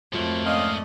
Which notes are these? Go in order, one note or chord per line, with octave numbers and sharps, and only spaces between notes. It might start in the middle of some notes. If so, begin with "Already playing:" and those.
F2 G#2 F3 F#3 A3 A#3
C4 C#4 D5 D#5 F5